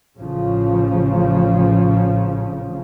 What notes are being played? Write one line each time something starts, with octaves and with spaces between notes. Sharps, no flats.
A1 C#3 F3